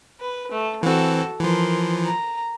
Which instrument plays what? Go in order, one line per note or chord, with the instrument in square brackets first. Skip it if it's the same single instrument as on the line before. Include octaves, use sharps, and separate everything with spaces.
[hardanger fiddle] B4
A3
[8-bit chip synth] E3 C4 [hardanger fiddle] F#4 A4
[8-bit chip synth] E3 F3 [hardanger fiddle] A#4 C6
[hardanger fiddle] A#5